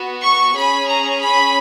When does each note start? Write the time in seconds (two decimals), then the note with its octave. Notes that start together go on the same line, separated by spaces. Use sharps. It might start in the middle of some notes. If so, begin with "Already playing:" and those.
Already playing: B3 F#4
0.23 C#6
0.55 C#4 G#4 B5
0.88 A#5
1.21 B5